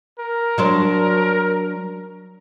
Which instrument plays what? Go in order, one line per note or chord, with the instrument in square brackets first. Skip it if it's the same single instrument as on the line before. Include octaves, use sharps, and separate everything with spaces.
[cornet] A#4
[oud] F#3 D4 C5